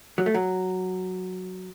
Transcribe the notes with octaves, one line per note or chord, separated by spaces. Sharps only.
F#3
A3
F#3